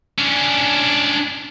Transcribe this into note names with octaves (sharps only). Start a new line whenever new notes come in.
C#4 D4